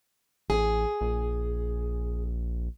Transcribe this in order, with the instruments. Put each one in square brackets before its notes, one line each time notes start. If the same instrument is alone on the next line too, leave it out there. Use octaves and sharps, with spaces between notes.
[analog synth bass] A1 [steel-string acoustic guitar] G#4
[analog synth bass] A#1